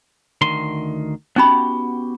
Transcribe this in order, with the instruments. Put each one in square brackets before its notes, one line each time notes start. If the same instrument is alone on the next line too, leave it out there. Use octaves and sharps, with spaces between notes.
[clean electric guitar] D2 D#3 C6
[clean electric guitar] B3 F#4 G4 [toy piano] C#4 D#4 B5